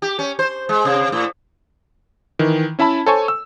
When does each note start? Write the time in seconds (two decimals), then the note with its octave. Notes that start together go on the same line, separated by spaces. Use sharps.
0.02 G4
0.19 C#4
0.39 C5
0.69 G#3
0.85 C3
1.12 A2
2.39 D#3 E3
2.79 C#4 E4 E5 A5 B5
3.06 A4 C5 C#5 G#5 C#6
3.28 E6